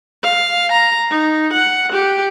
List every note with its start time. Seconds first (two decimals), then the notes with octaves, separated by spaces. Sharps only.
0.23 F5
0.71 A#5
1.11 D#4
1.53 F#5
1.92 G4